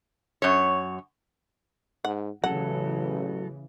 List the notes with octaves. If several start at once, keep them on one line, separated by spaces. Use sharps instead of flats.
F#2 C#5
G#2 F#5
A1 C#3 E3 F#3 A4 F#5